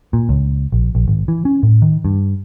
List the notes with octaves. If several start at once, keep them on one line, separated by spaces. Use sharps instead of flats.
A#2
C#2
A#1
A#1
G#1
E3
C#4
A2
D#3
G2